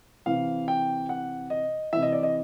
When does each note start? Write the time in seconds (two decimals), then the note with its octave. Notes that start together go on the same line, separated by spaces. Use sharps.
0.26 C3 E3 F5
0.68 G5
1.09 F#5
1.50 D#5
1.93 C3 E3 E5
2.02 D#5
2.12 D5
2.23 D#5